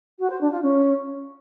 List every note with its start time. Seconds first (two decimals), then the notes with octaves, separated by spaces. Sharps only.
0.19 F#4
0.29 C5
0.40 D4
0.51 F4
0.62 C#4